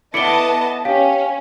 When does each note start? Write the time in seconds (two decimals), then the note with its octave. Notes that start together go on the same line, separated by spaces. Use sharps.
0.14 B3 E4 A4 D5 D#5 A5 C#7 G7
0.85 C#4 G4 F5